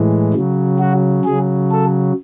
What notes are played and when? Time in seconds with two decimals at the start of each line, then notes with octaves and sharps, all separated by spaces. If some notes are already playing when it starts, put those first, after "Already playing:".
Already playing: A2 E3 G#3
0.34 C#3 F#3
0.79 F#4
1.25 C#3 F#3 G#4
1.71 A4